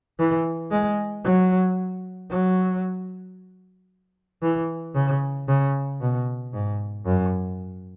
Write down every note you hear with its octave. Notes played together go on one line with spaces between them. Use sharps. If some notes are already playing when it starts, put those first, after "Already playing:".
E3
G#3
F#3
F#3
E3
C#3
C#3
B2
G#2
F#2